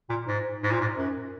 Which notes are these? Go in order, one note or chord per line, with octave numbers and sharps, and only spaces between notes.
A#2
G#2
G#2
A#2
G#2
F#2